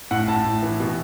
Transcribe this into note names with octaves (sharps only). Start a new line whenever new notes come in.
A2 F#5
A2 A5
A2
E3
B2